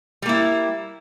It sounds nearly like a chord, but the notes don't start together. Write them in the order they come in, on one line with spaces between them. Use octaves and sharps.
G3 A#3 E4